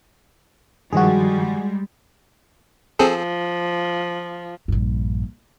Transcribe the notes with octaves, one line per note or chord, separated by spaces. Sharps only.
G2 D#3 F3 G3 G#3 F#4 G#4
F3 C4 G#4 A4
A#1 G2